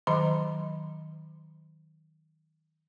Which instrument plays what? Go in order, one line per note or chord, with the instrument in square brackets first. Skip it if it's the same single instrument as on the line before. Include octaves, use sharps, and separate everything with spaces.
[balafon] D#3 F#3 D#5 A#5 B5